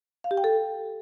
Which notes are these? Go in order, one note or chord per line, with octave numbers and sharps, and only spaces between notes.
F5
G4
G5
A4